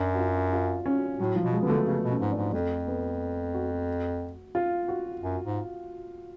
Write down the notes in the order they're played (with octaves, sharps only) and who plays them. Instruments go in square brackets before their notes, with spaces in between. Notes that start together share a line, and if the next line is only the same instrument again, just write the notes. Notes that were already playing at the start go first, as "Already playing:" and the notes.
Already playing: [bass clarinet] F#2 [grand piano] D4
[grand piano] F#4
F4
F4
C#4
[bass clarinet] A2 [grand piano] F#3
[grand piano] F3
[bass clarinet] B2
[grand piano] G#3
[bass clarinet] D3 [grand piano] B3
[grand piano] A3
[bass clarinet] C#3 [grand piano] B3
[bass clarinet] B2
[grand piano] C#4
[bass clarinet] G#2
[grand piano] D4
[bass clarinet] G#2
[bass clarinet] F2 [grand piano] A3
[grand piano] B3
F#4
F4
F#4
[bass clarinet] F#2
G#2